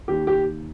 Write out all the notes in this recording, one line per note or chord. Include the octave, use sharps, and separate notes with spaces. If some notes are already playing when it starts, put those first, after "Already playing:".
D#2 G4
G4